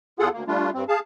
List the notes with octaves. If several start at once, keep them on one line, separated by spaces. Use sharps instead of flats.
E2 F4 G#4 A4 F#5
D2 A#3
G3 A3 D4 F4
G2 C4
G#4 F5 A5